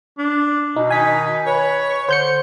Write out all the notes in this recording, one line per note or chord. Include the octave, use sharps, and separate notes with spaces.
D4
B2 D#4
D#3 D#4 G#5 B6
B4 C#5
D3 C5 G6 C#7